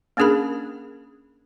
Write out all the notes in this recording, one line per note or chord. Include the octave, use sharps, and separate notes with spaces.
A#3 C#4 D4 G#4 A#4 B5